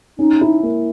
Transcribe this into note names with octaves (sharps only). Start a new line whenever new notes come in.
C#4 D#4
E4
A#3